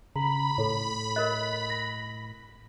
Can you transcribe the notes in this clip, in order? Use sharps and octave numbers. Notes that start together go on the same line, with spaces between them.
C#3 A#5 B5
A2 A4 C#5
A#4 D#5 F#6
A#6